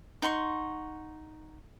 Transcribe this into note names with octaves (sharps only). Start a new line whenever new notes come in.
D#4 F#5 C6 C#6